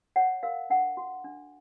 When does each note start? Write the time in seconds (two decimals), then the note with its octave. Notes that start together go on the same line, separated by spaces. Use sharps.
0.16 C#5 F#5
0.43 A#4 F5
0.70 D4 F#5
0.97 F#4
1.24 D4